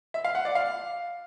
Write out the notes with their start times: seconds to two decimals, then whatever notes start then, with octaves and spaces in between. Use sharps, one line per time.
0.14 E5
0.25 F5
0.35 F#5
0.45 D5
0.55 F5